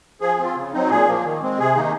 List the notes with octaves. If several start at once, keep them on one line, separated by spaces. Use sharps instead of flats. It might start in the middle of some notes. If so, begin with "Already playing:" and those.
F3 G#4
C4 F4
C#3
F#3 C4 D#4
A#2 G#4
F3 A#3
D#3
G#3 C4
C3 G#4
D#3 A#3 D#4